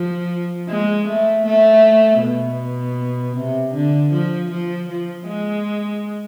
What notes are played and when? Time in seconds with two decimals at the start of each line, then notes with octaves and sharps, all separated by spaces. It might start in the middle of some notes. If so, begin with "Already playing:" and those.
Already playing: F3
0.69 G#3
1.08 A3
1.46 A3
2.22 B2
3.37 C3
3.74 D3
4.13 F3
4.51 F3
4.89 F3
5.28 G#3